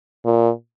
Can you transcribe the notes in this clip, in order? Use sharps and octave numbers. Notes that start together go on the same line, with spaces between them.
A#2